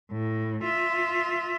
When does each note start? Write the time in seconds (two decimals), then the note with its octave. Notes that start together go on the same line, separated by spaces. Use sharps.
0.12 A2
0.64 F4 E5